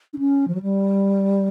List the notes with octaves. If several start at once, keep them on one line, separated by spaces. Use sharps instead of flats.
D4
C#4
F3
F#3
G3